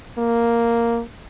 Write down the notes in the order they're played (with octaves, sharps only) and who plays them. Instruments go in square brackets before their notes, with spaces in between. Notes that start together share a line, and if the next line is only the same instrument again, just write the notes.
[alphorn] A#3